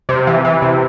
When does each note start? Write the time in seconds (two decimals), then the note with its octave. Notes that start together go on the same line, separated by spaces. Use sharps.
0.09 C3
0.27 E3
0.45 E3
0.62 C3